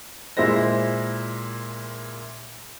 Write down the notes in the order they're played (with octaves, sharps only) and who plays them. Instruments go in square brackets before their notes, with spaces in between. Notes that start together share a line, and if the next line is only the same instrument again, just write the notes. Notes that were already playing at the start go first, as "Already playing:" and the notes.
[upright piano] A#2 G#3 E4 C5 A#6